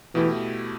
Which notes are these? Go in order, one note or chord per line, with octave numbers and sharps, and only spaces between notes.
B2 E3 A3 E4 G4